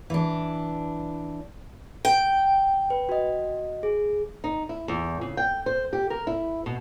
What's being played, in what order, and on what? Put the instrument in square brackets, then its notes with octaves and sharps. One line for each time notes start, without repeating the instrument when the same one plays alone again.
[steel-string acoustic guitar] E3 D4
G5
[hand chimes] B4
F#4 D#5
G#4
[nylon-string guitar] D#4
E4
E2
C#3
G5
C5
G4
A#4
E4
B2